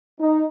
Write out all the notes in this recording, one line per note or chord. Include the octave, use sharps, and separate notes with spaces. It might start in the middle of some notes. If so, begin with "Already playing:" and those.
D#4